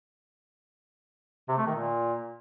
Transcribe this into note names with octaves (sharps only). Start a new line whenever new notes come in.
C3
A3
D#3
A#2